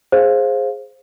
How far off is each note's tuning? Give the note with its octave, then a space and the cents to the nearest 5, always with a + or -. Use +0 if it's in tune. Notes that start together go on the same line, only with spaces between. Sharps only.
G#4 +0 C5 +15 F5 +0